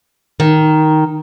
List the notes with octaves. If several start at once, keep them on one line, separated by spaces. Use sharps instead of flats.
D#3